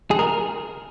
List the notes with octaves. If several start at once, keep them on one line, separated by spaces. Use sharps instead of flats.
G#4
A#4